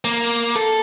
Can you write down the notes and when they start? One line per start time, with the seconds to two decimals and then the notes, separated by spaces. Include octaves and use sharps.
0.05 A#3
0.56 A4